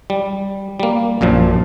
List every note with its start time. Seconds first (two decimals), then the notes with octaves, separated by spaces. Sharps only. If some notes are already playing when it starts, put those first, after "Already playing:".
0.10 G3
0.80 G3 A#3
1.21 A#1 F#2 A#2 F3